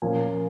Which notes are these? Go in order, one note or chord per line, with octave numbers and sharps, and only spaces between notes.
A#2 F3 A#3 C#4 G#5